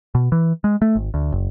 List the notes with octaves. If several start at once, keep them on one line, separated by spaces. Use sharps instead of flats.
B2
E3
G#3
A3
G#1
D2
F#1